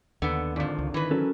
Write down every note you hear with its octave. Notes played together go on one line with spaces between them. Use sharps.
D#2 D3 B3
G#1 F2 D3 F3 D6
C#2
D#3 E3 B4
F#3 C#4 A4 A#4